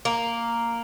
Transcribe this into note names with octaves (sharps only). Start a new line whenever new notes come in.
A#3